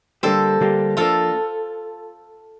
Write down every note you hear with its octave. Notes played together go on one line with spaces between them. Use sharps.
D3 G3 A#3 D4 G4 A4 C5
D3 G3 A#3 D4 G4
F3 A#3 D4 F4 A4